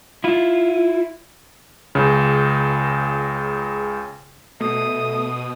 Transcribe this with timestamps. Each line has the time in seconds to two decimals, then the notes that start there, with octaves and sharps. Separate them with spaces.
0.24 E4 F4
1.95 C#2 C#3
4.60 B2 A3 D#6